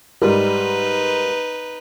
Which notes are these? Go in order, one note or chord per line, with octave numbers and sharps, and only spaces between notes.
G#2 G3 D#4 A#4 B4